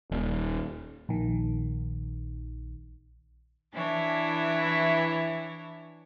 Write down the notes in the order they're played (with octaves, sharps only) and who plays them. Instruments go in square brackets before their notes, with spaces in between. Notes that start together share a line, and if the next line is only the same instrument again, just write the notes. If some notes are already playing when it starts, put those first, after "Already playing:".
[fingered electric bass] D#1
[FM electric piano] A#1 D#3
[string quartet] E3 D4 E4 C#5